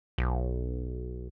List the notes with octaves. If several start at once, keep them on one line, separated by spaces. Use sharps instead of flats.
B1